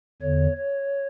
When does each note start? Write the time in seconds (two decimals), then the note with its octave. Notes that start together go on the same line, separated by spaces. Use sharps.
0.22 E2 D3 C#5
0.57 C#5